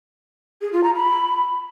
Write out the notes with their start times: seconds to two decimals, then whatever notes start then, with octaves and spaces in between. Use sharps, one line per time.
0.61 G#4
0.72 F4
0.84 A#5
0.95 B5